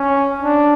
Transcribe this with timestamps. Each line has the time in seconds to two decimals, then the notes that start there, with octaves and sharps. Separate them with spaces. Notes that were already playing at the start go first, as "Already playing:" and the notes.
Already playing: C#4
0.42 D4